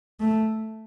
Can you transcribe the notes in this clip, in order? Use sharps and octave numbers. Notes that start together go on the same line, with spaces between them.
A3